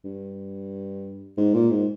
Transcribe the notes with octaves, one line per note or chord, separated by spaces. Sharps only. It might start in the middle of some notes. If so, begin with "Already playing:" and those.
G2
G#2
A#2
G#2